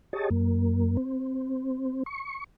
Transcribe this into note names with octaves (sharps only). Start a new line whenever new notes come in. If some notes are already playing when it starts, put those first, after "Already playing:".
G4 G#4 C#5 D#5 A5
F#2 A#3
C4
C#6